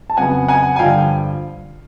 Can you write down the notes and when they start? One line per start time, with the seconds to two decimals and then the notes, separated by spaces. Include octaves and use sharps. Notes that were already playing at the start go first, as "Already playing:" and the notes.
0.10 A5
0.17 F2 C#3 F#3 B3 F#5 G#5
0.48 F#5 G#5
0.76 G#5
0.79 G2 D3 F3 F5 G5